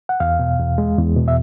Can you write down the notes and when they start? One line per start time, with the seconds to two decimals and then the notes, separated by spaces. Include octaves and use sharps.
0.09 F#5
0.20 E2 F5
0.39 B2
0.59 E2
0.78 G#3
0.98 E2
1.16 B2
1.28 E5